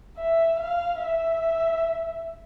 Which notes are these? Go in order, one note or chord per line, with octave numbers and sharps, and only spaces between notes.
E5
F5
E5